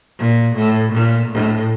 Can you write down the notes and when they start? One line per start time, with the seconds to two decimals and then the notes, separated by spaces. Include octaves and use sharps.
0.19 A#2
0.56 A2
0.92 A#2
1.28 A2